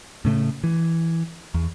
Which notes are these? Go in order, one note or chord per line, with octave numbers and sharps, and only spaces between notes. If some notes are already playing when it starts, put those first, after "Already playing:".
A2 C#3 A3
E3
E2